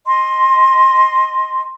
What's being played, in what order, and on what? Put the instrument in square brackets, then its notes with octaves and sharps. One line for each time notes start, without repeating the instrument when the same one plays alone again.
[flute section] D#5 C6